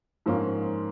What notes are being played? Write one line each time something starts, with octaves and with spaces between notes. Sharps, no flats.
G#2 F3 A#3 C#4